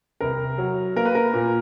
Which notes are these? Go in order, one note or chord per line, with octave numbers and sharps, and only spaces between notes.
C2 A#4
F#3
A#3 A#4
B4
A#4
A#2